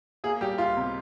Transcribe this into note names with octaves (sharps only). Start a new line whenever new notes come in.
A#3 G#4
G3 G4
C#2 F4
C3